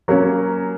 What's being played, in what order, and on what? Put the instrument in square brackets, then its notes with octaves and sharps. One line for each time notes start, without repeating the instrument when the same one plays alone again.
[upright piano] F#3 A#3 C#4